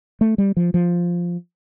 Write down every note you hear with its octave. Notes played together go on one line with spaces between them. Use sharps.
A3
G3
F3
F3